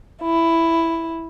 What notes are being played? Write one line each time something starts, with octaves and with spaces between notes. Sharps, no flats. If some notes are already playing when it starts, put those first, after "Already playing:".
E4